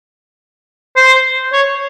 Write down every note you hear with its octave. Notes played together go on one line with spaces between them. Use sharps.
C5
C#5